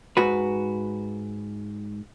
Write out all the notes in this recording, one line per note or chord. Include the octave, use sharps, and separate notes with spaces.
G#2 F#4 B4